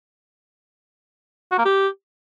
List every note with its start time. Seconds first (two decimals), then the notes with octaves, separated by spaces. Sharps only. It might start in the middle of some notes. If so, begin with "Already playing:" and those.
1.52 F#4
1.58 A#3
1.65 G4